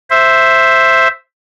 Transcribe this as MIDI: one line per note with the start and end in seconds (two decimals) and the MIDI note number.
0.10 1.08 72
0.10 1.08 76